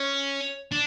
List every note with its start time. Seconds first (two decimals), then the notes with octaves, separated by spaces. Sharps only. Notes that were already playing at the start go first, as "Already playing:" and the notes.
Already playing: C#4
0.72 D4